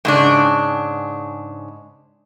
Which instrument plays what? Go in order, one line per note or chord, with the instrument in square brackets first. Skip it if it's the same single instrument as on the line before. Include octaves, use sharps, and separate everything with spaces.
[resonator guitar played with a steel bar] G#2 C#3 D4